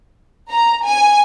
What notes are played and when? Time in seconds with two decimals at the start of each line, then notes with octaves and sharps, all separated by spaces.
0.52 A#5
0.85 G#5